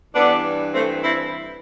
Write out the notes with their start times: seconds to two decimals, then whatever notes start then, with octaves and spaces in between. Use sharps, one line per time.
0.14 G2 E3 B3 D4
0.72 A3 C4
1.02 C4 E4